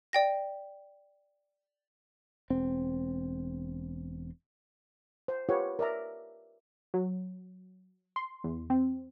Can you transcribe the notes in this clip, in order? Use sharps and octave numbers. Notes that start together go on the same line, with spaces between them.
D5 G5 A#6
E1 C4
C5
F4 G4 A#4 B4 C#5 F#5
A#4 D5 E5 A#5
F#3
C6
E2
C4